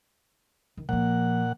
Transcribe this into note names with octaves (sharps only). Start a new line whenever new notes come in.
D#3
A#2 F3 A#3 F#5